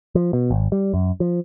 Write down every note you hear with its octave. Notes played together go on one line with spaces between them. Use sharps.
F3
B2
G#1
G3
F#2
F3